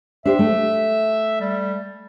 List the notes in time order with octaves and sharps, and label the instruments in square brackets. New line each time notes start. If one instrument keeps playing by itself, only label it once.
[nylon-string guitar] D4 G4 C5 [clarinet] E5
[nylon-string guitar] A3
[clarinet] G3